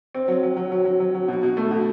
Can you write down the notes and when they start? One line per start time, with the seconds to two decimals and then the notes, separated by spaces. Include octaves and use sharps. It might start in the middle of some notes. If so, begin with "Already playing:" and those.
0.15 C4
0.28 F#3
0.43 F#3
0.57 F#3
0.72 F#3
0.85 F#3
1.00 F#3
1.15 F#3
1.28 B2
1.43 B2
1.57 A3
1.71 B2